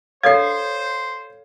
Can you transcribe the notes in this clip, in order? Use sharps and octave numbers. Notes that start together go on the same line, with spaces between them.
A4 C5 C#5 F5 G#6 C7